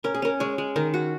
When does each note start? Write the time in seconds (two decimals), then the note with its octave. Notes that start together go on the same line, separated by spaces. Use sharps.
0.04 C#4 A#4
0.15 G#4
0.22 C#4 A#4
0.40 G#3 C#5
0.58 G#3
0.76 D#3 A#4
0.94 F#4